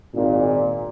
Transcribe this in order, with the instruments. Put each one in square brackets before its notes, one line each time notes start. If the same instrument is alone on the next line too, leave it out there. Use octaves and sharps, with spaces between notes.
[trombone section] G#1 A#2